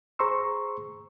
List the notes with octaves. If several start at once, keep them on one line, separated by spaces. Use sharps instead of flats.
G#4 C5 A#5 C6 C#6 E6